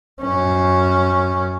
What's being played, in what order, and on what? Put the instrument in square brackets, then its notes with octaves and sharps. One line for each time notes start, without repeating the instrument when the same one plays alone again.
[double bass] F#2 C#4